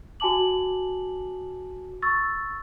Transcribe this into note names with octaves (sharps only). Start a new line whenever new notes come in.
F#4 G#5 A5 D6 F#7
C#6 E6 A6